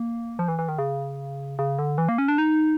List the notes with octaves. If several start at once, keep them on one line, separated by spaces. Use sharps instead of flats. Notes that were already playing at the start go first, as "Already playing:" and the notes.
Already playing: A#3
F3
E3
E3
D#3
C#3
C#3
D3
E3
A#3
C#4
D4
D#4